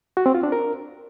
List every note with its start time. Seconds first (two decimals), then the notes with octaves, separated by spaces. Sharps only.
0.17 F#4
0.26 C4
0.35 F4
0.43 D4
0.52 A#4